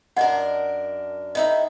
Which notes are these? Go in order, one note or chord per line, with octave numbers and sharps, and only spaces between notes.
F#2 D4 A#4 D#5 F#5
A2 D#4 D#5 E5